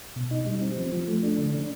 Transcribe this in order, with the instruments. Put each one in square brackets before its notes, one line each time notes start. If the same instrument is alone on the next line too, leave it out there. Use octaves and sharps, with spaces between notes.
[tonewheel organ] B2
D#4
G3
C4
F3
F3
A3
D4
D3
D4